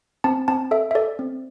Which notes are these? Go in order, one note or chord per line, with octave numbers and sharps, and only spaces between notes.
C4 A5
C4 A5
A4 E5
E5
A4 D5
C4